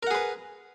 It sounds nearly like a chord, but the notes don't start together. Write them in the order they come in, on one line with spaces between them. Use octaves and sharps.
A#4 F#5 G#4 B4